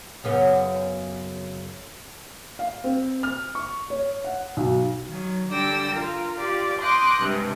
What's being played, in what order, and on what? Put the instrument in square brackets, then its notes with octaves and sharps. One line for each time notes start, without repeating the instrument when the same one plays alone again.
[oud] F#2 C#3 B3
[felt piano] F5
C4
F6
C#6
C#5
F#5
B1
[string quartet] D#3 F#3
D3 G3 D5 G5 E6 A#6
F4 A#4
F4 G4 D5
C6 D6 D#6 F#6 G6 A#6
G2 C3 G#3